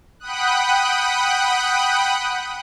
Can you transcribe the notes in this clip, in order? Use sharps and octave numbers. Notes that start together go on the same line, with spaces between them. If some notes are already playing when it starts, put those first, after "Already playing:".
F#5 G5 B5 D#6 F#6